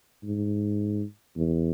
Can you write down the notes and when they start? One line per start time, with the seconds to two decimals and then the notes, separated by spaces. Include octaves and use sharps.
0.24 G#2
1.37 E2